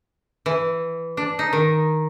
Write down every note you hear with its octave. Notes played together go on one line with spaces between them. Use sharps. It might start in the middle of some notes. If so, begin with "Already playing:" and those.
E3
D4
D#4
D#3